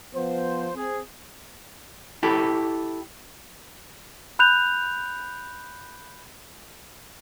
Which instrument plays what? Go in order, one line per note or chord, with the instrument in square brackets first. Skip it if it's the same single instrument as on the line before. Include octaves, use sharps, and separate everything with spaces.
[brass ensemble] F3 B3 C5
C4 G#4
[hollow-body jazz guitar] E4 G4 A4
[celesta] B5 F#6 G6 F7